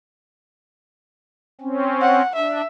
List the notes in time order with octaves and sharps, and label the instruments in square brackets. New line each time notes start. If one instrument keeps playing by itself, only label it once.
[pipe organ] C4 C#4
[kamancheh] F#5
[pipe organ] D4 [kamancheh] E5